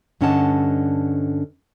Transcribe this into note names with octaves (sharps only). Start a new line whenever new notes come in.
G2 D3 C#4 D#5 F#5 A5